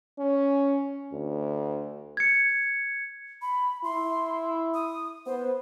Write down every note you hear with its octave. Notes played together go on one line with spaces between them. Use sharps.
C#4
D2
G#6 C#7
B5
E4 C6
D#6
B3 C5